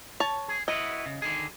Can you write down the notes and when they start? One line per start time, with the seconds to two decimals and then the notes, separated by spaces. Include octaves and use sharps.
0.20 C#5 A5
0.48 G#4
0.68 E4 F#4 B4 D#5
1.06 C#3
1.22 D3 D#3 G#4